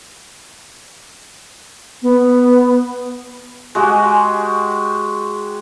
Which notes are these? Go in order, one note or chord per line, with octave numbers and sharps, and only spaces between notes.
B3
G#3 F#4 G4